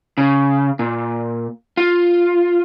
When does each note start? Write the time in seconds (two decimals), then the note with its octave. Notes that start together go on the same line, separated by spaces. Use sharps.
0.18 C#3
0.79 A#2
1.77 F4